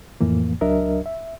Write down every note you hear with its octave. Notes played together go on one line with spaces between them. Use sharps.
F2 A2 E3 A#3
C#2 F#3 D4 A#4 D#5 E5
E5